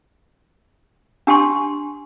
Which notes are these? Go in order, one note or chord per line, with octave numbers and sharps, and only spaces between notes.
D4 G4 G#5 C6 C#6